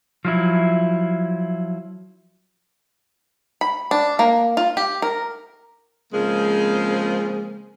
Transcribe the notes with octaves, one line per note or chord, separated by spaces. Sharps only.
F3 F#3 E4
B5
D4
A#3
F4
G4
A#4
C#3 F3 G#3 A#3 C4 G#4